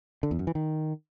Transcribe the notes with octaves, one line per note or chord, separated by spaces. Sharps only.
D3
E2
F#2
E3
D#3